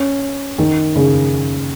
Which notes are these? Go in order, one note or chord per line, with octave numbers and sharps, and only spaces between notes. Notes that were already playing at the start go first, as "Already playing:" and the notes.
Already playing: C#4
D#3
C#3